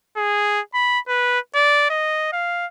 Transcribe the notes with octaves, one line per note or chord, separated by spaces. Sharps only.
G#4
B5
B4
D5
D#5
F5